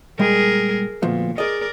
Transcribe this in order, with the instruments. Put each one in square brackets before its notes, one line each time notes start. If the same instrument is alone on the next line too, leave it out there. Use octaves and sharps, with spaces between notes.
[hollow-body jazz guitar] A#2 G3 G#3 [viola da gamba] G#4 A#4
[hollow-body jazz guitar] D2 F3 B3 [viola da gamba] A#2
[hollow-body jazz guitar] G#4 D#5 [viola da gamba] A#4 D5